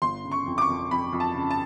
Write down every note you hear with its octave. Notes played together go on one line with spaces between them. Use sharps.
G1 C6
C#3
C#6
F2
D6
C#6
F2
F2 B5
F2
A5
C#3
A5